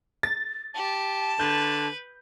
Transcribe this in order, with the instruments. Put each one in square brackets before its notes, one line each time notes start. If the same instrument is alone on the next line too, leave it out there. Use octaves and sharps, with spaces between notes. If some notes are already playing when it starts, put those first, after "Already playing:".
[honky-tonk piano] A6
[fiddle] G4 [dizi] A5
[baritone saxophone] D3 [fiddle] B4 [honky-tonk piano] G6